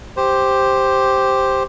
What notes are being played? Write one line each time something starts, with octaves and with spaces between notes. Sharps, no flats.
G4 C5